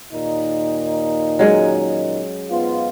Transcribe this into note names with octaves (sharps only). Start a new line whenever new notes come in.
D#2 A#2 D#4
F#3 G#3 C#4
G#2 B3 F4